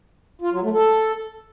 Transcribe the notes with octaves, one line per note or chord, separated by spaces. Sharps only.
F4
F#3
A3
A4